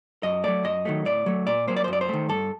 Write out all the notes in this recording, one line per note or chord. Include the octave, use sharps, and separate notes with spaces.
F#2 D#5
F#3 A3 D5
F#2 D#5
D#3 F#3 A3
A2 D5
F#3 A3
A#2 D5
F#3 A#3 C5
D5
C5
F#2 D5
C5
D#3 A3
G2 A4